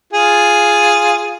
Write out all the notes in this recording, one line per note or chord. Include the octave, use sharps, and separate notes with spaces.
F4 G#4